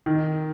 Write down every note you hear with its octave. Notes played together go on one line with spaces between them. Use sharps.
D#3